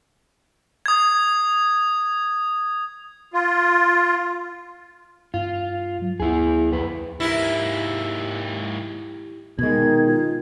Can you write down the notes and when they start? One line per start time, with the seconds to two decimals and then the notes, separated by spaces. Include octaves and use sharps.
0.86 D#6 G#6
3.33 F4
5.34 G2 F4
6.02 F#3
6.20 D2 E4 G#4
6.72 F2 B4
7.20 G#2 A#3 E4 G4
9.59 B2 D#3 G#3 G#6
10.06 F4